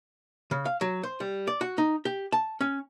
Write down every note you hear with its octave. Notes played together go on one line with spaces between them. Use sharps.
C#3
F5
F#3
C5
G3
D5
F#4
D#4
G4
A5
C#4